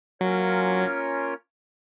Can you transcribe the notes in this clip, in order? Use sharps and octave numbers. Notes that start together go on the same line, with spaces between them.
F#3 A#3 C#4 F4 A#4 C#5